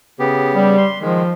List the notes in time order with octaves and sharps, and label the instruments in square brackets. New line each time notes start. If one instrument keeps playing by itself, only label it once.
[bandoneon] C#3 B3 G4
[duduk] G3
[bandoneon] C6
[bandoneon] D#3 G#3 [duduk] F3